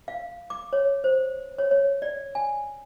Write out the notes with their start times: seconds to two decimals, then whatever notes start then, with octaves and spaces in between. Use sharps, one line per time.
0.08 F5
0.50 D6
0.73 C#5
1.04 C5
1.58 C#5
1.71 C#5
2.02 D5
2.35 G#5